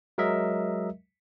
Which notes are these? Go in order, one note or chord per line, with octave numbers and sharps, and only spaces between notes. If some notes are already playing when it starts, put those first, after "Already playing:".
F#3 G#3 A#4 D#5 E5